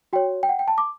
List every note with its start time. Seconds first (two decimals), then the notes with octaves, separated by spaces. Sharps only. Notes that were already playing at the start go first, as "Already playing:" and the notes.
0.13 F#4 C#5 G5
0.43 G5
0.49 F#5
0.59 G5
0.68 A5
0.78 D6